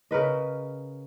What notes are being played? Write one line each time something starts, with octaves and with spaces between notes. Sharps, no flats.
C#3 A#4 B4 D#5